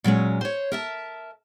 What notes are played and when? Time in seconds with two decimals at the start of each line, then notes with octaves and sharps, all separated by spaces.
0.04 A#2 F#3 G#3 C#4
0.41 C5 C#5
0.72 A#4 E5 A5